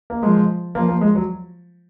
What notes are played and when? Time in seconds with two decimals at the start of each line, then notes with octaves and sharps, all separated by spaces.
0.10 A#3
0.22 F3 G#3
0.75 F3 A#3
0.88 A#3
1.01 G#3
1.15 F#3